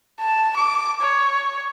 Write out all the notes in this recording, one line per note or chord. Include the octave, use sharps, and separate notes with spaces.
A5
D6
C#5